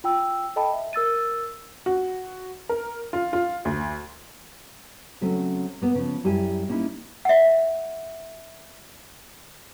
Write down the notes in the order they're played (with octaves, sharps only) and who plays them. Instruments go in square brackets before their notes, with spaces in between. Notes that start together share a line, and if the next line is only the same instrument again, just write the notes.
[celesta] F4 G5 E6
A4 D#5 G5 A5 B5
E5
A#4 E6 A6 D#7
[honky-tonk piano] F#4
A#4
F4
F4
D2
[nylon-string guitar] C#3 F#3 A3 C4 C#4
A#3 B3
C#3 F3
F#2 G3 E4 G4 G#5
A#3 C#4 D#4 E4
[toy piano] E5 F#5